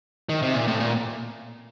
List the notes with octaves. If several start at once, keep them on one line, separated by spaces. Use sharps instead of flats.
D#3
C3
A#2
A2
A#2